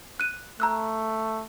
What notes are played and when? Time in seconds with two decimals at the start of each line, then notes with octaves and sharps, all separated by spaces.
0.20 F#6 D#7
0.60 A3 A#5 E6 F#6